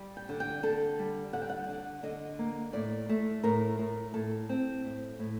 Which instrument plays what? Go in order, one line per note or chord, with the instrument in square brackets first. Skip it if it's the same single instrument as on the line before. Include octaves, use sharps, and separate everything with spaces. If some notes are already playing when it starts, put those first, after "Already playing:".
Already playing: [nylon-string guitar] G3
G5
D3
G5
D3 A4
G3
D3 F#5
G5
F#5
D3
D3 D#5
A#3
A2 D5
A3
A2 A#4
A2
A2 A4
C4
A2
A2